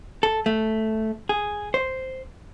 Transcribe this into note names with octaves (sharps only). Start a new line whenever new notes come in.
A4
A3
G#4
C5